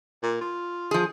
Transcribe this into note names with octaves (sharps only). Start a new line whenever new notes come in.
A#2
F4
F3 G#4